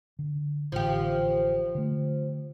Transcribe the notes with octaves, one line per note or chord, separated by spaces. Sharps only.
D3
A1 D3 E3 F3 G4
D3 A3